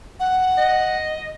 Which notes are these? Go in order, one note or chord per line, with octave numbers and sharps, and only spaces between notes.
F#5
D#5